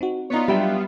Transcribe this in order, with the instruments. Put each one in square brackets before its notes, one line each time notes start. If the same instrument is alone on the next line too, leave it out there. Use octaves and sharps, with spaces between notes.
[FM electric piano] C4 D#4 F#4
[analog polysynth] B3 F4 [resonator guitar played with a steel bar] D#4 C#5
[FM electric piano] F#3 D4 [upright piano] G3 [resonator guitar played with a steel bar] G4 E5 G5